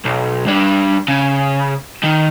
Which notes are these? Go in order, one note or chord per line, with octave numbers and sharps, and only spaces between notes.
B1
G2 D4
C#3
D#3